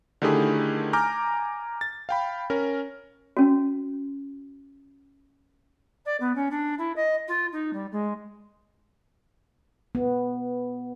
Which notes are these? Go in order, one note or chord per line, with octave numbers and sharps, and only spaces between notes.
D3 D#3 A3 E4 G4 G#4
G#5 A#5 D6 F6 G6
A6
F5 G5 B5
C#4 A#4
C#4 F#4
D5
B3
C#4
D4
E4
D#5
F4
D#4
G3
G#3
B3